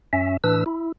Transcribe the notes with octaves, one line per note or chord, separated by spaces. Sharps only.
F#2 C#4 E5
A2 E3 D4 B4 E6
E4